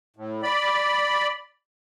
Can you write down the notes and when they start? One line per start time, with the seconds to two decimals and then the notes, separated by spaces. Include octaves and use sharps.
0.17 A2
0.43 D5 B5